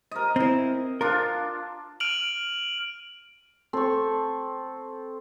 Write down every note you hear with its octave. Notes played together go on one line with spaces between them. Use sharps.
A#4 D#5
C4 E4
D4 F4 A#4
F6 D7 D#7 F7 F#7
C4 A4 C#6